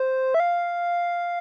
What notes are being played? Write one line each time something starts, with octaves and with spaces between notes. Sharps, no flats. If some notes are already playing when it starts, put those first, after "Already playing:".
Already playing: C5
E5
F5